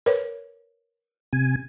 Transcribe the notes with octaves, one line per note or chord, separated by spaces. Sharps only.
A#4 B4 C#5
C3 G#5